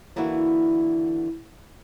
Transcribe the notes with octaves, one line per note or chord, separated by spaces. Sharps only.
D3 E3 A#3 E4 F#4